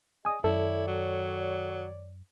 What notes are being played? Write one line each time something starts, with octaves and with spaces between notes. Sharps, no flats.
G#4 D5 D#5 G#5 D#6
F#2 D#3 E4 A4 C#5 D5
F#3